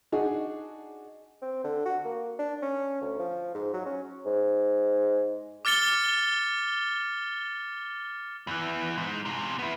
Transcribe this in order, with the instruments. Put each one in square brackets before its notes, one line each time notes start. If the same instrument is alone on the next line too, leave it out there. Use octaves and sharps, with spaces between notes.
[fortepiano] D4 D#4 F#4 G#4
[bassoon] C4
D3
F#4
A#3
D4
C#4
D2
F3
G#2
F#3
C#4
G#2
[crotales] D6 F6 A6 C#7 G7
[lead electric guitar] E2 E3
G#2
E2 C3
B3 E4